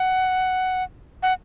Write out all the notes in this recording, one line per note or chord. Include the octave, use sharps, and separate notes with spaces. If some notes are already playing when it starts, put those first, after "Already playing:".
Already playing: F#5
F#5